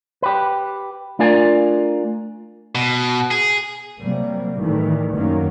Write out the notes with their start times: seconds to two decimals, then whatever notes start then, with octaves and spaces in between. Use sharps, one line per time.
0.22 G4 B4
1.19 A3 D4 F4 A#4 D5 G#5
2.75 B2
3.31 G#4
4.00 C3 F#3 G3 A#3
4.59 A2 D#3 E3 G3 A3
5.13 F#2 D#3 F#3 A#3 C#4